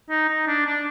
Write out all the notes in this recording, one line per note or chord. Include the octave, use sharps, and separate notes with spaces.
D#4
D#4
D4
D4